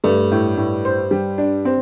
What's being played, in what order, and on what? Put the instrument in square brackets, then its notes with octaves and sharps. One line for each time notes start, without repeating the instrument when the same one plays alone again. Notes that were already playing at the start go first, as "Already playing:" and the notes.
[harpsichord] G2 [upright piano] A3
[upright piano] A2
A2
C5
G3
D4
C4